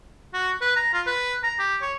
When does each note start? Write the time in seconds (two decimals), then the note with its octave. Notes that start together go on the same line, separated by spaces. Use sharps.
0.34 F#4
0.61 B4
0.76 A#5
0.93 F4
1.07 B4
1.44 A#5
1.59 G4
1.82 C#5